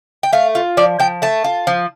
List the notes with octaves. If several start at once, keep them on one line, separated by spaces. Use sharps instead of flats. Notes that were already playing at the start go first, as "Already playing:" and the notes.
G5
A3 F5
F4
F3 D5
F3 G5
A3 A5
F4
F3